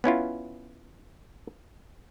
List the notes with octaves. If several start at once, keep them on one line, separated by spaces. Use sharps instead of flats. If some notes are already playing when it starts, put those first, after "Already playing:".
B3 C#4 E4 F4